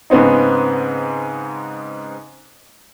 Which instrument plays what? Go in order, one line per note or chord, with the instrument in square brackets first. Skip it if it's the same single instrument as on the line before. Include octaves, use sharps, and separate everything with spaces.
[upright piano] G#2 C#3 B3 C4 D#4